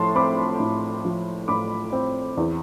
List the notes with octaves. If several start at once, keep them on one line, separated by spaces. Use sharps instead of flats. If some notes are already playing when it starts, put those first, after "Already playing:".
Already playing: A2 F3 A5 C6
C4 B5 D6
A2
F3
A2 B5 D6
C4
E2